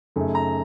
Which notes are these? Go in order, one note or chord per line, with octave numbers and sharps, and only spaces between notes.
F#2 C#3 A3 D#4
A#5